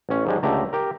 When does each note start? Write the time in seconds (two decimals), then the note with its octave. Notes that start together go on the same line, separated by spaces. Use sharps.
0.09 A1 C#4
0.26 G#2 F3 G3 G#3
0.43 C#2 D3 A3 G4 A#5
0.73 G4 A#4